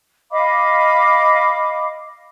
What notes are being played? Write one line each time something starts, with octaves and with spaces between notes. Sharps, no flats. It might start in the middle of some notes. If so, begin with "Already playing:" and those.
D#5 F5 B5 D6